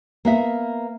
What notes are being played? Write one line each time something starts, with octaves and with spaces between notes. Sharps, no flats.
A#3 B3 E5